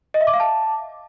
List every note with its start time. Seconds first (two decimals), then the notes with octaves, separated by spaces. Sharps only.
0.14 D#5
0.21 E5
0.27 D6
0.33 F5
0.40 A5